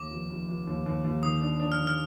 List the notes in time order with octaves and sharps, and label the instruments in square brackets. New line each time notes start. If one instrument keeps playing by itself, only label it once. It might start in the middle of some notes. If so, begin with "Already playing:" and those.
Already playing: [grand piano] D#2 D#3 [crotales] D6
[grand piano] F1
F1
F1
D#2
D#2
D#2
[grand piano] D#3 [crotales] D#6
[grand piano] D4
D4
[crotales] F6
[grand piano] D#3
[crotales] F6